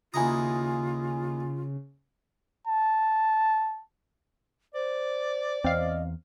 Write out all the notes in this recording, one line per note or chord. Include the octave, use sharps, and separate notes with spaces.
D#2 C#3 E4 F4 G#5 A#5 D#6
A5
C5 D5
E2 C4 D#5 F5